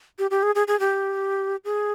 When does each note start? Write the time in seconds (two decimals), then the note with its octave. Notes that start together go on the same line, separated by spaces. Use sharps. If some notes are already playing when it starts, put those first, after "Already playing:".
0.19 G4
0.31 G4
0.43 G#4
0.55 G#4
0.68 G#4
0.80 G4
1.65 G#4